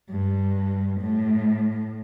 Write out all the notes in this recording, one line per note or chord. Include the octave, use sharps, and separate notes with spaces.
G2
A2